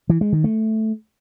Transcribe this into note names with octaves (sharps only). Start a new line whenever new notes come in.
E3
G#3
D#3
A3